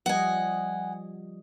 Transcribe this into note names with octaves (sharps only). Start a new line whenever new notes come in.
F3 G3 D#5 F#5 G#5